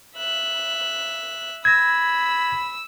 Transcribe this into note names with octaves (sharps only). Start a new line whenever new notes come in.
E5 F#6
B5 E6 G#6 A#6